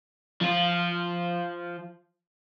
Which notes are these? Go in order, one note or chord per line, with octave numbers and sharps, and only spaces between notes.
F3 F4